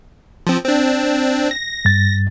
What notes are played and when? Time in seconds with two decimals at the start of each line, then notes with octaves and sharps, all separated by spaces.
0.47 F3 C4
0.64 C4 D4
1.51 A#6
1.85 G2 A6